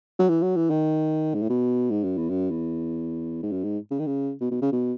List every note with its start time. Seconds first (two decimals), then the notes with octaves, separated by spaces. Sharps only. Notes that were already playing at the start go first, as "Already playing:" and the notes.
0.19 F#3
0.29 E3
0.42 F#3
0.56 E3
0.70 D#3
1.34 G#2
1.42 A2
1.49 B2
1.91 G#2
2.04 F#2
2.17 E2
2.30 F#2
2.51 E2
3.42 G#2
3.51 F#2
3.64 G#2
3.91 C#3
3.99 D#3
4.06 C#3
4.41 B2
4.51 B2
4.62 C#3
4.72 B2